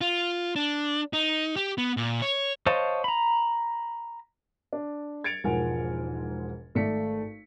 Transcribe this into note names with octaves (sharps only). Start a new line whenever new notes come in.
F4
D4
D#4
G4
B3
A#2
C#5
C5 C#5 D#5 F5 A5
A#5 B5
D4
G#6 A6 C#7 D7 F7
E1 G#2 F3 A#4 F#5 G#5
G#1 A3 D5 B6 C#7